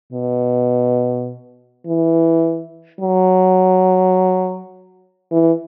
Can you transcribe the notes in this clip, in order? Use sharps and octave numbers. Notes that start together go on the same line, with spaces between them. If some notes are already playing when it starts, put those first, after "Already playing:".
B2
E3
F#3
E3